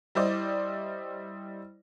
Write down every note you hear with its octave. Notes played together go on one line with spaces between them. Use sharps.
G3 E4 C5 D5 D#5